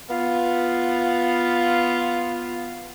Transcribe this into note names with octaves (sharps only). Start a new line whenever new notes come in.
B3 F4 F5